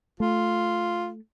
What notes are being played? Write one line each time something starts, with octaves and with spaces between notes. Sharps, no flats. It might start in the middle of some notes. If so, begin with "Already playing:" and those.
A3 F4